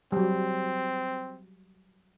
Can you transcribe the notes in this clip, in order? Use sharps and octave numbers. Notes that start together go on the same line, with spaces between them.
F#3 G3 C4